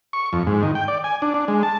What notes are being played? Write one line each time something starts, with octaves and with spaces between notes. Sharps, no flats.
C#6
F2
G#2
D#3
G5
D5
G#5
D4
D4
G#3
A5